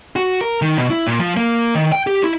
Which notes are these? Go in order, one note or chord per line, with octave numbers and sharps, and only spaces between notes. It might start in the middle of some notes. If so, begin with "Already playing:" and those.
F#4
A#4
D#3
B2
E4
A#2
F3
A#3
D#3
G5
G4
E4